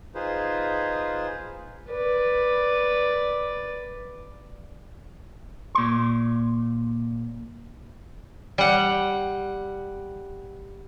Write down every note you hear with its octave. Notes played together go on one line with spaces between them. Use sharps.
D#4 F4 G#4 B4 C5
B4 D5
A#2 C6
G3 F#5